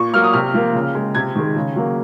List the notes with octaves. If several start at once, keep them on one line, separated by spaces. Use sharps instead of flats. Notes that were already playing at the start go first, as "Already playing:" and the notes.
Already playing: A#2 C#6
F#3 A#3 F6
D#6
C3 F6
F3 A#3
C#3
G#3
C3 G#6
D#3 G#3
C#3
F#3 A#3